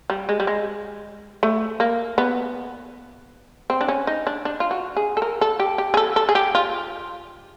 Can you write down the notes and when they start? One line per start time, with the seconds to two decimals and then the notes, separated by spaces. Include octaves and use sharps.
0.10 G3
0.29 G#3
0.40 G3
0.47 G#3
1.43 A3
1.80 A#3
2.18 B3
3.70 C4
3.81 D4
3.88 C#4
4.07 D#4
4.27 D4
4.45 D4
4.60 F4
4.71 F#4
4.97 G#4
5.17 A4
5.22 A#4
5.41 A4
5.60 G4
5.78 G4
5.94 G#4
5.97 A4
6.16 A4
6.29 G#4
6.35 G4
6.55 F4